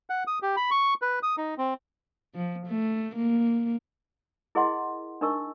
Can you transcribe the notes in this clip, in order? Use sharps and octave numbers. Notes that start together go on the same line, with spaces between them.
F#5
D#6
G4
B5
C#6
B4
D#6
D#4
C4
F3
A3
A#3
E4 G#4 A#4 D#5 F#5 C6
D4 D#4 A#4 D#5 C#6 E6